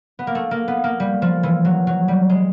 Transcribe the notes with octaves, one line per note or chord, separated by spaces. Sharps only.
B3
A#3
A3
A#3
B3
A#3
G3
F3
E3
F#3
F#3
G3
G#3